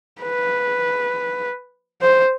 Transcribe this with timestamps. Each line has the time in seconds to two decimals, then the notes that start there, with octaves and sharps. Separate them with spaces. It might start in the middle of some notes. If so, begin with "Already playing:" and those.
0.22 B4
2.02 C5